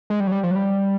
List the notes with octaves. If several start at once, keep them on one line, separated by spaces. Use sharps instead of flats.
G#3
G3
F#3
G3
F3
F#3
G3